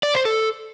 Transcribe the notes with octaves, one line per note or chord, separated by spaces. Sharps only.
D5
C5
A4